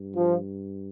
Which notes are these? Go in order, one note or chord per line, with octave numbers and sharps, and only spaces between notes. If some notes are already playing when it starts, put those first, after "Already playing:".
Already playing: G2
F3